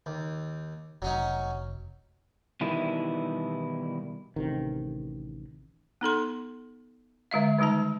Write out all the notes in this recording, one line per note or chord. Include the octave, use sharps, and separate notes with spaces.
D#2
F1 F#3 C#4 D#4
B2 D#3 E3 G3 E4
A1 C3 D#3
B3 D#4 A4 C6
D3 G#3 E5 F5
D#3 G3 G#3 D#4 A5